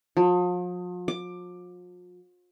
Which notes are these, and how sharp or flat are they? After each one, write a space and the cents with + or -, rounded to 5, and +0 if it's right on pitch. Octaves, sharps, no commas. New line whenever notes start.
F3 +40
D6 +15